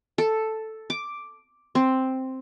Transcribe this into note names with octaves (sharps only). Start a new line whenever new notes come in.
A4
D6
C4